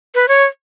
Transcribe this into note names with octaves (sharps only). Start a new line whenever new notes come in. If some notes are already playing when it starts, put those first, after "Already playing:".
B4
C#5